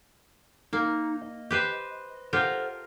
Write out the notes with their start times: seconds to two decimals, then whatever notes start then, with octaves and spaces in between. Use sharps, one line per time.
0.73 A#3 D#4
1.22 D#5
1.50 G4 B4 C5
2.33 F4 G4 A4 A#4 C5 F#5